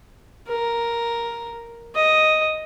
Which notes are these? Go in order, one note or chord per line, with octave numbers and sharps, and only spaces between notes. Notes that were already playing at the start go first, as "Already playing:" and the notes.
A#4
D#5